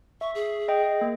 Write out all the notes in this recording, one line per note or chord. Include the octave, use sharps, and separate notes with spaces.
E5 C#6
G#4
D#5 G5
A#3